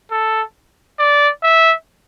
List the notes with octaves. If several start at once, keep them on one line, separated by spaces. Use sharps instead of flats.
A4
D5
E5